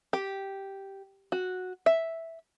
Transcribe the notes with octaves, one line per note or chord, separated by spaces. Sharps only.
G4
F#4
E5